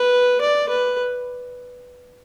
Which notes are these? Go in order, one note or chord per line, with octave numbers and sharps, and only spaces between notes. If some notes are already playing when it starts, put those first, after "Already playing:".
Already playing: B4
D5
B4